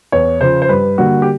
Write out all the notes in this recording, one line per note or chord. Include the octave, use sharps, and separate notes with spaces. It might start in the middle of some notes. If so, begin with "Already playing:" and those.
E2 C#5
C#3 F3 C5
C5
G2 B4
D3 G3 A#3 F#4
G4